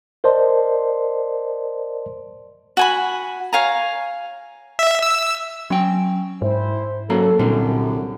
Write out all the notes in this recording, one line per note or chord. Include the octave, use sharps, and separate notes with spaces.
A#4 C5 D5 D#5 A5 C6
F#4 G#5 B5
C#5 F5 G#5 A#5
E5
E6
F#3 C#4 G5
G#2 E4 C5
F#2 F#3 A#3 A4 A#5
C2 F#2 A#2 D3 G3